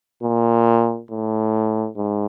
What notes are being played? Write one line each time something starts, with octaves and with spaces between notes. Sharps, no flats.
A#2
A2
G#2